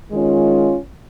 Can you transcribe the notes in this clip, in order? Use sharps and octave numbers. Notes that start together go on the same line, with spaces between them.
D#3 G#3 C#4 F4